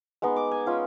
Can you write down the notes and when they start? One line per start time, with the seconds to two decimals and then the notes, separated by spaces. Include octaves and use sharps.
0.22 G#3 B3 D#4
0.36 D6
0.51 G#5
0.66 G#3 C#4 F4 G5